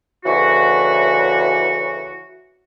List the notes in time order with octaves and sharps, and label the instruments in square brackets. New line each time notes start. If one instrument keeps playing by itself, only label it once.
[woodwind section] D2 C#3 E3 F#4